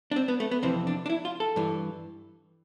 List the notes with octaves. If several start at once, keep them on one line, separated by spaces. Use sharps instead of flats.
D4
C4
B3
A3
B3
F2 C3 E3 C4
D4
D4
E4
F4
A4
G2 E3